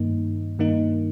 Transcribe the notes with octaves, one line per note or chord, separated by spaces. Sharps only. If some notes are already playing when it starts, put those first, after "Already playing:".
Already playing: G2 D#3 A#3 D#4
G2 D#3 A#3 D#4